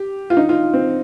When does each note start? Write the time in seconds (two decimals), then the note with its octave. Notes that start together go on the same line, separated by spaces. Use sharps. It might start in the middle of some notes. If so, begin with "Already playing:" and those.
Already playing: G4
0.30 F4
0.37 D#4
0.49 F4
0.74 C4